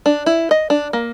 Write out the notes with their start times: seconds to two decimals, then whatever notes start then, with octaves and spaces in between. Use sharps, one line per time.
0.06 D4
0.26 E4
0.51 D#5
0.70 D4
0.93 A#3